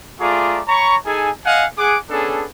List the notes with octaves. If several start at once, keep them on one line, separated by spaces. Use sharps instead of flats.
A3 F4 G#4 D5 A#5 D6
C#5 A#5 B5 C#6
D#4 G#4 A4 G#5
D#5 F5 F#5 G#5
G#4 F#5 D6
B3 C#4 D4 G#4 A4